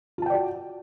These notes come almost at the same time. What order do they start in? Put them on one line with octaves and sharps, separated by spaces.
F4 A5 G5 D5 F#4